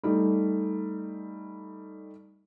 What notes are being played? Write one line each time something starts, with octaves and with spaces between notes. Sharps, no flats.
G3 A3 D#4